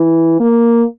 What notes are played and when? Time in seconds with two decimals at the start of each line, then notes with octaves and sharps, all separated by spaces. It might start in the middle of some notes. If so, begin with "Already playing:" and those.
Already playing: E3
0.40 A#3